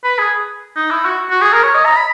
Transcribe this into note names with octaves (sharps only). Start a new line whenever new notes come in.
B4
G#4
D#4
E4
F#4
F#4
G#4
A#4
C#5
D#5
A#5
B5